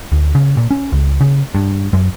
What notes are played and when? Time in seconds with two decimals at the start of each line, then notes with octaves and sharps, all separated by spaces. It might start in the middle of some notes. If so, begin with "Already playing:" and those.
0.12 D2
0.35 C#3
0.57 A#2
0.71 C#4
0.92 C#2
1.21 C#3
1.55 G2
1.93 F#2